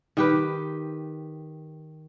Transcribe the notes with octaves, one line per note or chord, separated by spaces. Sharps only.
D#3 G4 B4